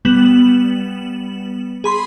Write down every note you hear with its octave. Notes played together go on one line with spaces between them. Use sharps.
G3 B3 E7 F#7
G#4 B5 C6